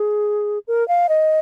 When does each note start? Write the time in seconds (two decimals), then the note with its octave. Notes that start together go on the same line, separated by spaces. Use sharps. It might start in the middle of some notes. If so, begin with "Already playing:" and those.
Already playing: G#4
0.68 A#4
0.88 F5
1.09 D#5